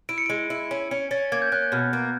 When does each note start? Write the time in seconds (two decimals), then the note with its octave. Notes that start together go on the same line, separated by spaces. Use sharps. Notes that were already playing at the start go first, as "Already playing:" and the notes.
0.09 E4 D7
0.18 C#7
0.26 G#3 D7
0.50 E4
0.71 C#4
0.91 C#4 C#7
1.11 C#4 A6
1.32 A#3 G#6
1.42 G6
1.52 C#4 F#6
1.62 F#6
1.72 B2 F6
1.93 A#3